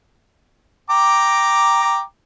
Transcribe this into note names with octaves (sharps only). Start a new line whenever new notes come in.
G5 A#5 D6